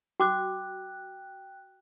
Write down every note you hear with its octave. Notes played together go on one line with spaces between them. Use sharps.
F#4 G5 D6 F#6